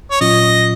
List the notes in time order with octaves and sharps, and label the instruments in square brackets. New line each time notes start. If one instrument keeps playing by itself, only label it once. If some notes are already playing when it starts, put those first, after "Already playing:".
[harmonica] C#5
[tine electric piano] A#2 F#3 C#4 F4 [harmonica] D#5